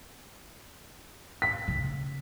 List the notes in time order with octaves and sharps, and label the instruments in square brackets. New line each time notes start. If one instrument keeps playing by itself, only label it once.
[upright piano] B6
[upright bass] C#3